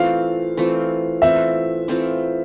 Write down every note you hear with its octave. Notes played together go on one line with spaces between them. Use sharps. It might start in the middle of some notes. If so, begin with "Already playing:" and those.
Already playing: E3 A3 C4 F4 F5
E3 A3 C4 F4
E3 A3 C4 F4 E5
E3 A3 C4 F4